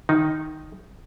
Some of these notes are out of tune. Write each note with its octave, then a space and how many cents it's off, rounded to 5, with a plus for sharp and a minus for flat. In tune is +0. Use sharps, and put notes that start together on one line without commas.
D#3 +0 D#4 +0